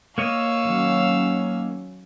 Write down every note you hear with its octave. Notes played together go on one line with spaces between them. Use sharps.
A#3 C#5 D#5 F5 C#6 E6
D#3 F#3 C#4